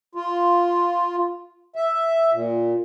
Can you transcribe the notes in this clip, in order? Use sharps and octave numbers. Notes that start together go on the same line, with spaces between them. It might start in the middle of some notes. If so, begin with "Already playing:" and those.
F4
E5
A#2